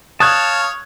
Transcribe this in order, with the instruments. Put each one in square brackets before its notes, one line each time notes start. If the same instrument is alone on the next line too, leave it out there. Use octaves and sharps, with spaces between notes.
[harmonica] C#5 F5 [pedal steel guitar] A5 [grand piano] D#6 F#6 G#6